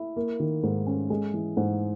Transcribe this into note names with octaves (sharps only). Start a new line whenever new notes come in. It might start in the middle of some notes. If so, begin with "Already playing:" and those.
Already playing: E4
A#3
D#3
G#2
C#4
G#3
E3
G#2